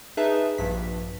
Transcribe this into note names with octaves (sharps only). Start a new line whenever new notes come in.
D#4 G#4 B4 E5 A5
A#1 G2 B6